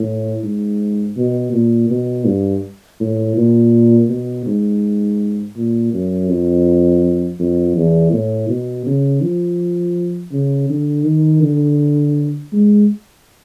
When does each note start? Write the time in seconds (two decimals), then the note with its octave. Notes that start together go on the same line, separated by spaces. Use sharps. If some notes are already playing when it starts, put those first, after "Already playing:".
Already playing: A2
0.44 G#2
1.17 B2
1.53 A#2
1.90 B2
2.26 G2
3.00 A2
3.37 A#2
4.09 B2
4.46 G#2
5.56 A#2
5.93 F#2
6.29 F2
7.39 F2
7.76 E2
8.13 A2
8.49 B2
8.87 C#3
9.22 F3
10.32 C#3
10.70 D3
11.05 D#3
11.43 D3
12.52 G#3